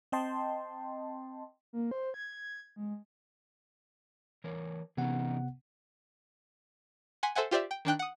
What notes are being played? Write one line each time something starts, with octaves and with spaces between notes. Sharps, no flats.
C4 D#5 G5 A5 C6
A#3
C5
G#6
G#3
E3 A#4 C#5
C3 E3 B3 C#4 D#4 F#5
F#5 G#5 C6 B6
A4 C5 E5 F#5 G#5
F4 G4 C5 D5 E5
G5
D#3 D4 G5 F#6
F#5 D#6